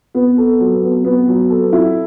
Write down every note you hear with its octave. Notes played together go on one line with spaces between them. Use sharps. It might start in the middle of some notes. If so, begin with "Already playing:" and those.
B3
A4
F#3
B3
B3
F#3
A4
E4